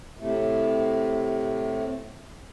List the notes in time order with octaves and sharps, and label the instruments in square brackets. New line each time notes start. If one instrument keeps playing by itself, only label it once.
[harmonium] A2 C3 A3